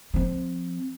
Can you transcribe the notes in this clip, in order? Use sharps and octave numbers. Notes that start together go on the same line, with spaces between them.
F3 C4